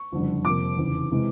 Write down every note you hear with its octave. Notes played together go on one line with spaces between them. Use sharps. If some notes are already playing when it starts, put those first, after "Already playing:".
Already playing: C#6
F#1 F2 D3 G3
F2 C3 F3 A#3 D6
F1 E2 C#3
C3 E3 G#3